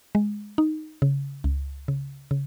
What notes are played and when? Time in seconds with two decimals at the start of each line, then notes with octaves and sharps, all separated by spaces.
0.15 G#3
0.58 D#4
1.02 C#3
1.44 C#2
1.88 C#3
2.31 C#3